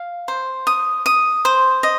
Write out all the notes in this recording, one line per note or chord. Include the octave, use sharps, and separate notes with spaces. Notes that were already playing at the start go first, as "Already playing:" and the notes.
Already playing: F5
C5
D#6
D#6
C5
D#5